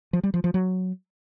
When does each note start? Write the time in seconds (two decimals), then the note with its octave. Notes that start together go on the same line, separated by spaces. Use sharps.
0.13 F3
0.23 G3
0.34 F3
0.44 F3
0.54 F#3